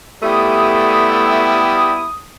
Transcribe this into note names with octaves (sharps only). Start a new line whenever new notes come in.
G3 A3 B3 E4 G4 D#6